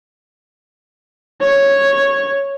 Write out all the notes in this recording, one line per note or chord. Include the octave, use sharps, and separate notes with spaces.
C#5